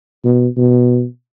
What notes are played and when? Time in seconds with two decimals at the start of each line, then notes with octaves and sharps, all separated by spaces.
0.24 B2
0.57 B2